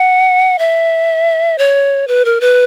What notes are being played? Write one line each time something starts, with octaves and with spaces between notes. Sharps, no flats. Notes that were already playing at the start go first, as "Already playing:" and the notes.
Already playing: F#5
E5
C#5
B4
A#4
B4